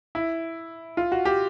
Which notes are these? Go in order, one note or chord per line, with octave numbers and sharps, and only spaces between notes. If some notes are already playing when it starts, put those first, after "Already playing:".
E4
F4
F#4
G4